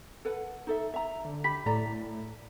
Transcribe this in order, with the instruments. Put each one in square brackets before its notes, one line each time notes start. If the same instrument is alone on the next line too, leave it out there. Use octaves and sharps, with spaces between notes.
[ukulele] A4 B4 F#5
D#4 A4 E5
E5 A#5
[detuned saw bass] D3
[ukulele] G4 B5 [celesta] B6
[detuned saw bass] A2 [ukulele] A4 D5 A#5